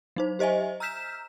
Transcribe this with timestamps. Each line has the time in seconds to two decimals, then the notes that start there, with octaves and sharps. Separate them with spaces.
0.16 F#3 D#4 C5
0.39 G4 C5 D#5 E5 G#5
0.80 A#5 E6 F6 G6 B6 E7